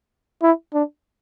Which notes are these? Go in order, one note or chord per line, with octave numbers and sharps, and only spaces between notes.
E4
D4